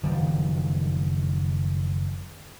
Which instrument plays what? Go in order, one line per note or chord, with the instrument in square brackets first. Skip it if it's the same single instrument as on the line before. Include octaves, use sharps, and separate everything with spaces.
[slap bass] F#1 D#3 F3 G3